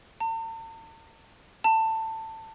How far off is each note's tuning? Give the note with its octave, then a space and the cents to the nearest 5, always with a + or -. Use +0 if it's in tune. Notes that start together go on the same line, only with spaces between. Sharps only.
A5 +45
A5 +20